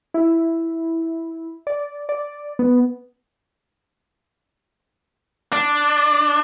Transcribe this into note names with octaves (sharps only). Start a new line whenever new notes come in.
E4
D5
D5
B3
D4